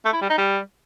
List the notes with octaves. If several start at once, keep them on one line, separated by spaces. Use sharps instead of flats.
A3
E4
G3
D#4
G3